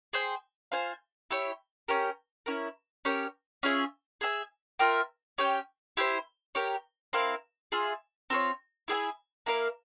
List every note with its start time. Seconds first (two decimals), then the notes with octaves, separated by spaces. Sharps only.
0.13 G#4 C5 G5
0.72 F4 C5 F5 G#5
1.31 E4 G4 C#5
1.88 C#4 G4 A#4
2.46 C#4 E4 A#4
3.05 C#4 G4 A#4 C#5
3.63 C#4 F4 G#4 E5
4.21 G#4 E5 G#5
4.79 F4 A#4 E5 G5
5.38 C#4 G4 C#5 G5
5.97 E4 G4 C5
6.55 G4 A#4 C#5
7.13 C4 E4 A#4 F5
7.72 F4 G#4 E5
8.30 C4 F4 A#4 C#5
8.88 E4 G#4 E5 G#5
9.46 A#3 E4 A#4 F5